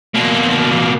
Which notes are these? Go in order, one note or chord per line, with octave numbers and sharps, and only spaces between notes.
B2 A#3